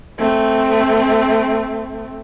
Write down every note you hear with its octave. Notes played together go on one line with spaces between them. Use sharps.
A3 C4